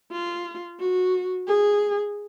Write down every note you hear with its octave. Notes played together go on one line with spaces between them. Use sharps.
F4
F#4
G#4